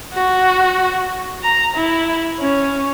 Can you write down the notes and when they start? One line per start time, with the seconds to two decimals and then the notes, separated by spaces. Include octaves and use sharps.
0.12 F#4
1.43 A#5
1.76 E4
2.40 C#4